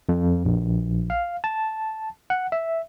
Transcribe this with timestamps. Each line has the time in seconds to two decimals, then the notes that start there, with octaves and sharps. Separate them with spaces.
0.09 F2
0.45 A#1
1.10 F5
1.44 A5
2.30 F#5
2.52 E5